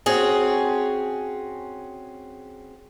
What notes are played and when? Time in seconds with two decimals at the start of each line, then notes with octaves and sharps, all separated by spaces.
0.06 C4 C#4 F#4 G#4